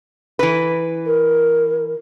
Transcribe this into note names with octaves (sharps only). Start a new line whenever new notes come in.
E3 B4
A#4